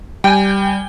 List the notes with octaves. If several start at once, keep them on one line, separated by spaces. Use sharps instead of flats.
G3 G5 G#5